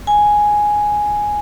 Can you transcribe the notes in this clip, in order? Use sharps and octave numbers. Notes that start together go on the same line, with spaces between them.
G#5